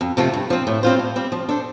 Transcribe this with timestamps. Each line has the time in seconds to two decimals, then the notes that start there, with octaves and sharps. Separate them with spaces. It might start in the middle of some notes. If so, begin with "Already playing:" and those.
0.01 F2
0.17 C3 F3 A3 F4
0.33 G2
0.50 F3 C4
0.67 A2
0.83 G3 C4 F4 C5
0.99 A2
1.16 G3 C4
1.32 F3
1.49 D4 A4 C5